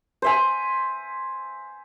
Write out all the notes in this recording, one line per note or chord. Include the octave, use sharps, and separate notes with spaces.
C5 E5 G#5